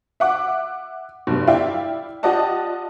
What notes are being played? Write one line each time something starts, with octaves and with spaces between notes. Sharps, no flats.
E5 F#5 D6
F1 G2 B2
E4 D5 E5 F5 G5
F4 G4 D5 D#5 F#5 A5